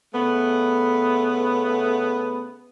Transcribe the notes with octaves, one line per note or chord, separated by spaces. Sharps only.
C#3 A3 B3